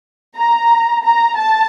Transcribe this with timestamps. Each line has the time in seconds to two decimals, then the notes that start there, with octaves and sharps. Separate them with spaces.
0.37 A#5
1.05 A#5
1.37 A5